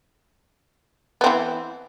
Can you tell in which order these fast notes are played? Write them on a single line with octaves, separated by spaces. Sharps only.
B3 C4 E3